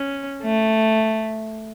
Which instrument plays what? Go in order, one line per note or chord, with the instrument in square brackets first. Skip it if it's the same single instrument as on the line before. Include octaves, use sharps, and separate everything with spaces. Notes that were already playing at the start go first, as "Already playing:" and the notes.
Already playing: [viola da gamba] C#4
A3